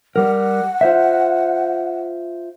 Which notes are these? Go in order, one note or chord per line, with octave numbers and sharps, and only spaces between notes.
G3 A#4 F#5
F4 C5 E5